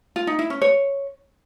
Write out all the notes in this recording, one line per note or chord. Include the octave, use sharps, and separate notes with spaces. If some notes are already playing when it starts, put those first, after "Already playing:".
F4
D#4
E4
C#4
C#5